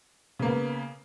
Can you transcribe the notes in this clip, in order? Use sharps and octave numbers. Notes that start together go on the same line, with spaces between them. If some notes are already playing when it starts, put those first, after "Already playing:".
C#3 A#3 B3